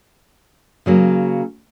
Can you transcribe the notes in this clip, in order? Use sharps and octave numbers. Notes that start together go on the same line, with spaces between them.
C#3 F#3 A#3